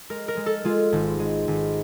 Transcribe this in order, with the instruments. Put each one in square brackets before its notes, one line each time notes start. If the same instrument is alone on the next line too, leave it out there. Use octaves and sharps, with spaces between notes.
[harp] G#3 A#4
A#4
G#3
A4
G#3 F4
G#1
G#3
G#1